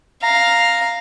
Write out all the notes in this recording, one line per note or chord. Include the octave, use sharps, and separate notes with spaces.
F5 A#5